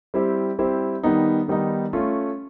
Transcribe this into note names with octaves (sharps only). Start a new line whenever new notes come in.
G3 C4 E4 G4
G3 C4 E4 G4
D#3 G3 B3 D#4
D#3 G3 B3 D#4
A3 C#4 F4